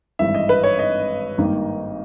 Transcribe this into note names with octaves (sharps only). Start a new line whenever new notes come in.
G#1 G2 E3 E5
D#5
B4
C#5
D#5
G#1 G2 D#3 A#3